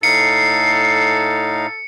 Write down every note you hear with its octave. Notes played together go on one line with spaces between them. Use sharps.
A2 D#4 A4 F5 C7 C#7